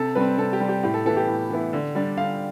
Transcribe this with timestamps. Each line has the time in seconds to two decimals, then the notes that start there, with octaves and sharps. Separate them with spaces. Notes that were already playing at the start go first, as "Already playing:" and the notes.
Already playing: C3 A4
0.15 G3 C4 B4
0.38 C3 A4
0.53 G4
0.60 G3 C4
0.69 G4
0.83 A2 G4
0.94 A4
1.05 E3 B3 E4 A4
1.17 G4
1.28 A2
1.50 E3 B3 E4
1.73 D3
1.95 G3 D4
2.17 D3 F5